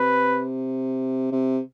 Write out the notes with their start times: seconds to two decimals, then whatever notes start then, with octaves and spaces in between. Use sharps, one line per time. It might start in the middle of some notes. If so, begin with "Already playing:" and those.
Already playing: C3 B4
1.32 C3